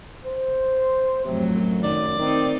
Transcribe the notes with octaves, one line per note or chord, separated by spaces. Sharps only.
C5
F2 A2 C3 F#3
F#2
D#3 D5
D#3 C4 D#4